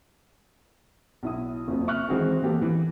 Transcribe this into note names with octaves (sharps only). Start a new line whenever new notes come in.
B1 E4 D#6
F#1 F2
E5 C#6 F6 F#6
D#3 E3 G#3 C4 F#4 G#4
E3 A#3 B3 G4 A4
E3